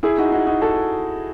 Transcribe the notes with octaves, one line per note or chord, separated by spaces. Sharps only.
E4 G#4
D#4 F#4
D#4 F#4
D#4 F#4
F#4 A4